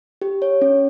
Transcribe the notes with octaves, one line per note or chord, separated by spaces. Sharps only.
G4
C#5
C#4